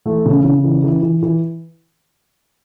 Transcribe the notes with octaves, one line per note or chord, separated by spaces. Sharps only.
E3 A3
C#3
C#3
E3
E3
E3
E3